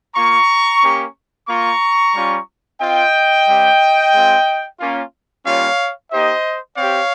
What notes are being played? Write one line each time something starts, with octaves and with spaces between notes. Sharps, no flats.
A#3 F4 A#5 C#6
A#3 C#4 G4
A#3 F4 A#5 C#6
G3 C#4 F4
C4 F4 D#5 G5
G3 C4 G4
G#3 C4 F4
A#3 C#4 F4
G3 A#3 C#4 F4 C#5 F5
A#3 D#4 G4 C5 D#5
C4 G4 C#5 F5